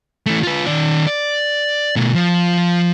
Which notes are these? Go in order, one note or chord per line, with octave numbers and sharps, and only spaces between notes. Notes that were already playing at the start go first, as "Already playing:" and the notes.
E3 A3
F4 B4
D#3 D5
D5
B2 A3
F3